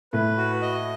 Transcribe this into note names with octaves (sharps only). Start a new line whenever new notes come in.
A2 B4
F#4
D#5